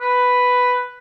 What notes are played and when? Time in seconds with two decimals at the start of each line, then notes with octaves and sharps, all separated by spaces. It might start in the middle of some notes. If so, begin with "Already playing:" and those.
0.01 B4